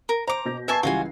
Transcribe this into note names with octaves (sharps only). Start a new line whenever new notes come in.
A#4
C5 A#5 D6
B2 G6 A#6
B4 E5 G#5 A5 C#6 C7
C#2 E3 G3 F4 F#4 G#5